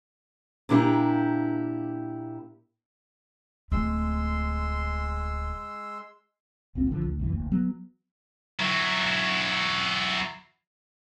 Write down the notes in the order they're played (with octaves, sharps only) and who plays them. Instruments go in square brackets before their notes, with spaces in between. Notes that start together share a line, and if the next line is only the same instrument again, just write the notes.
[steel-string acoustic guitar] A#2 A#3 D4 E4 G4
[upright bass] D1 A3 [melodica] G#3 C6 E6
[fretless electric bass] G1 C#2 A#2 C4
A1 D3 F3
D2
B1 F#2 E3
F1 D2 A#3
F#3 B3
[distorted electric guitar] F#3 E4